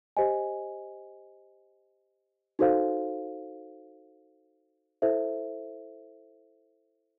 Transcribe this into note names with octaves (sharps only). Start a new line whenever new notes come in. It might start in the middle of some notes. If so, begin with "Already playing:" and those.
G4 C5 D#5 G#5
D#4 F#4 A4 C5 F5
E4 A4 C5 E5